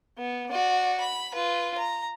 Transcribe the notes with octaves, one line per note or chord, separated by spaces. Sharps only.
B3
F#4 D5
B5
F4 B4
A#5